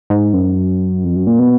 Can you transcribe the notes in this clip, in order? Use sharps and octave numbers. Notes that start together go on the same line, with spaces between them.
G#2
F#2
F2
F#2
A#2
B2